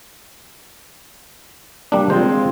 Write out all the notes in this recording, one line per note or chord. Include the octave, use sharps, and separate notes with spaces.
G3 A#3 D4
G#3 C4 F4 C5